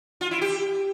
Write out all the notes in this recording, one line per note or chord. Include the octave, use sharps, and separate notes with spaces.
F4
E4
G4